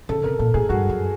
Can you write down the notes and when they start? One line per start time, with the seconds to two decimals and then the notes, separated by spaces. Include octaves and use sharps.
0.09 C#3 A4
0.24 C3 A#4
0.39 A#2 A4
0.54 A2 G#4
0.69 G2 F#4
0.89 F#2